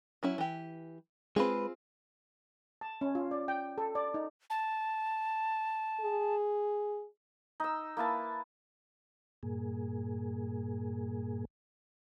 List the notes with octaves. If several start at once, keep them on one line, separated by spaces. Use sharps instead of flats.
F#3 C#4 E4
E3 G4
G#3 C4 F4 G#4 B4
A5
C#4
F4
D5
G5
A4
D5
D#4
A5
G#4
D#4 E6
A#3 E4 B4 A5
G2 A#2 A#3 G#4